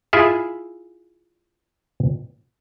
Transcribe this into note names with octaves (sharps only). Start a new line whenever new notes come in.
E4 F4 G#4 E5